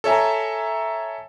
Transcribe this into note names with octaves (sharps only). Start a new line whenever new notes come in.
A4 C#5 E5 G#5 A#5